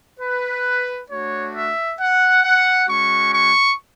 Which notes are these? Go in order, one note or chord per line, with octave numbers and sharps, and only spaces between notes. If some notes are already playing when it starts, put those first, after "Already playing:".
B4
A3 D4 F#4 C#5
E5
F#5
F#5
G#3 C#4 F#4 C#6
C#6